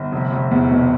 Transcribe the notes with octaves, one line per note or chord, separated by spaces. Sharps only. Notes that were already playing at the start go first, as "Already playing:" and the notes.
Already playing: G1
F1
F1
E2
B2